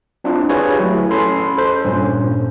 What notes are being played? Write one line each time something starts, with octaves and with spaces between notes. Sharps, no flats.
C4 D4 E4 F4
G4 G#4 B4 C#5 F5 G#5
F#3 A3 E4
C#4 A4 B5 C6
A4 C5
G2 A#2 C#4